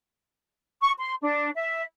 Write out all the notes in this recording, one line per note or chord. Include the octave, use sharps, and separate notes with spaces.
C#6
C6
D4
E5